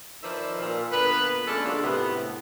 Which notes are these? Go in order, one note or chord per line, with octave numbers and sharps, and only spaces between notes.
D#3 F3 B4 C5 D5 E5
A#2
A#2 D3 B3 B4
D3 G#3 A#3 C#4 D4 A4
A#2 D3 F#3 G#3 D4 F4
A2 C3 B3